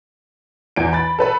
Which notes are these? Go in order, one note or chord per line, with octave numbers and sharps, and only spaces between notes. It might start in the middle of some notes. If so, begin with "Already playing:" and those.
E2 D7
B5 A6
A4 B4 B5